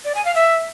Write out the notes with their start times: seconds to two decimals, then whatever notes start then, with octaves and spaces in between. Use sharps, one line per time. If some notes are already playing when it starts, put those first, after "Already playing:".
0.05 D5
0.15 G#5
0.25 F5
0.35 E5